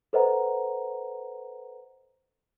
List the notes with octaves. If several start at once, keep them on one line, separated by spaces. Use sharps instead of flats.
A4 B4 C5 D#5 F#5 A#5